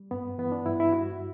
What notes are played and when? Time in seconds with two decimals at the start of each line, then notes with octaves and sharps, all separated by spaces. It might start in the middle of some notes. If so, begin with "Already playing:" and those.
Already playing: G3
0.11 G2 B3
0.38 E3 B3
0.52 D4
0.66 G2 E4
0.80 E4
0.92 G3 F#4